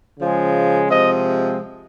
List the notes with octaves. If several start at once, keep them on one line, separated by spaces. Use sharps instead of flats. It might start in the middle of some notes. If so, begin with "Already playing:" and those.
C#3 F3 G#3
C3 F3 G#3 C4 D#5